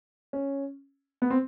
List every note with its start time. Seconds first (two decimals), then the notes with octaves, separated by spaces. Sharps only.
0.33 C#4
1.22 B3
1.30 C4